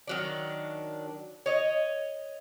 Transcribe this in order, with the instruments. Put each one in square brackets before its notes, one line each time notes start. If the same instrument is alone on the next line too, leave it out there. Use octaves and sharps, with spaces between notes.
[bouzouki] D#3 F#3 D4
C#5 D#5